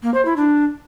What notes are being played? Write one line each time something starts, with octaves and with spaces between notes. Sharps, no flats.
A#3
C5
E4
D4